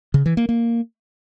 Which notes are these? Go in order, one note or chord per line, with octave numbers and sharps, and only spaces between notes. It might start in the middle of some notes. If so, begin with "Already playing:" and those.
C#3
E3
A#3
A#3